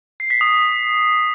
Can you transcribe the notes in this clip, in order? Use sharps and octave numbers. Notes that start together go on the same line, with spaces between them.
C7
B6
D#6